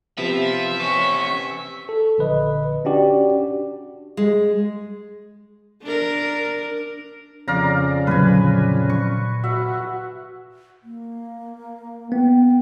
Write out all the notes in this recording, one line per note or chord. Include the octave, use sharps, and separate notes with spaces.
C3 F3 B3 E5
E3 C#4 C#6
A4
A#1 D3 B4 D#5
C#4 D4 F#4 G4 D5
G#3
D4 A#4
F2 C#3 D5 F5 A#5
A#2 D3 F#3 B4 G#5
C#6
F#4 E5
A#3
B3 G5